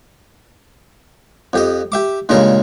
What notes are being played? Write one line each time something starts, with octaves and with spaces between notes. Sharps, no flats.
F2 G4 D#5
G4 E5 D6
G2 A#2 C#3 G#3 A#4